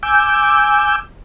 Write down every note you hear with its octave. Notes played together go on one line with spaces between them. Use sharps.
G#5 D6 E6 G6